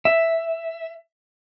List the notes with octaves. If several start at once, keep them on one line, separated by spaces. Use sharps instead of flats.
E5